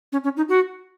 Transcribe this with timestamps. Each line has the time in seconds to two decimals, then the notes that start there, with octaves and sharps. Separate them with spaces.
0.12 C#4
0.24 C#4
0.37 D#4
0.49 F#4